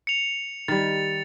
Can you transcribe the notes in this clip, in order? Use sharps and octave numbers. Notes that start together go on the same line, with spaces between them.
C#7 F7
D#3 G3 A6